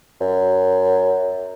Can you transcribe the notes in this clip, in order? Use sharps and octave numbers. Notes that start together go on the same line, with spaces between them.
F#2